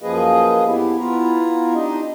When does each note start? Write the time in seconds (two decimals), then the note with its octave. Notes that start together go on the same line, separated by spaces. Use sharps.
0.02 F#2 F3 A#3 G#4 B4 D#5
0.66 B3 E4 G4
0.99 B3 E4 F4 A#5
1.75 D4 D#4 G4 D#5